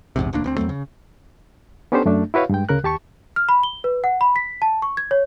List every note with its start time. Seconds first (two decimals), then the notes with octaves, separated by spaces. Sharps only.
0.16 A#1 E2 G#2 C3
0.33 E1 D2 A#3 D4
0.44 D2 A#3 C4
0.57 E2 F#3 A3 C4
0.69 C#3
1.92 B3 C#4 D4 G4 A4 C5
2.06 F#2 A3 D4
2.34 E4 F#4 B4 C#5 F5
2.49 G2 G#3 G5
2.69 D2 C#3 A#4 F#6
2.84 D#2 G4 A5 C#6
3.36 F6
3.49 B5
3.63 G7
3.84 B4
4.04 F#5
4.21 B5
4.36 B6
4.62 A5
4.82 C#6
4.97 G#6
5.11 C#5